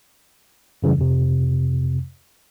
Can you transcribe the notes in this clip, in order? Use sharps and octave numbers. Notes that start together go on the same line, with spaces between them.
F#2 C#3 E3 G3
F2 C3